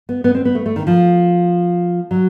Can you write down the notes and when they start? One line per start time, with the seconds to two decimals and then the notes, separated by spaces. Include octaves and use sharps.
0.09 B3
0.24 B3
0.35 C4
0.45 B3
0.55 A3
0.66 A3
0.76 D#3
0.87 F3
2.11 F#3